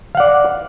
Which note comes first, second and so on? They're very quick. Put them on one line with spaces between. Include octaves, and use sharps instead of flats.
F5 F#5 D5